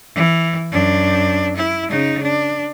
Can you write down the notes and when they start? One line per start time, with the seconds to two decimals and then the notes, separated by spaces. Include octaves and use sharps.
0.15 E3
0.72 F#2 D4
1.57 E4
1.89 C#3 D#4
2.23 D4